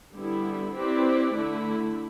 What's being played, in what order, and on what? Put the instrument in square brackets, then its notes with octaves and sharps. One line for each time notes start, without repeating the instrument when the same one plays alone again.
[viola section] D3 G3 B3 E4
C4 E4 G4 B4 D5
D3 A3 E4